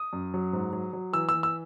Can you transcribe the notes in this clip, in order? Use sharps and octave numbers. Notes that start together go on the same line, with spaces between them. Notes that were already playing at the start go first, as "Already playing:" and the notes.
Already playing: D#6
F#2
F#3
G#2
F#3
F#3
E3 E6
E6
E3
E6